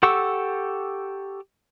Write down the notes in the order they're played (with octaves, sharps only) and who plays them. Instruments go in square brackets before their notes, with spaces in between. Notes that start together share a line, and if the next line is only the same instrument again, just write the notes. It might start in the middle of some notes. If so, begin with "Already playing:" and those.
[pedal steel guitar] G4 A4 F#5 C#6 E6